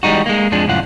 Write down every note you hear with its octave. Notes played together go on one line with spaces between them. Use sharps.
E3 G3 G#3 D#4 F#4
G#3 A#3
F2 F3 G#3 D4
C#2 F#2 A2 F4 F#5